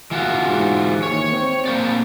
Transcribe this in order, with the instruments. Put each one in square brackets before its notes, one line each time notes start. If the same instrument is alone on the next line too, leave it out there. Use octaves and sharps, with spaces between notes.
[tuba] F#1 [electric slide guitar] E3 F4 F#4
[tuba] G#2
[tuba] D#2 [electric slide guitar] C#5
[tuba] C4
[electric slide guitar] A#3 C5 D5